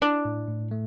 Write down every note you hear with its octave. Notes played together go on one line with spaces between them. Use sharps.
D4 E4
A2
A2
A3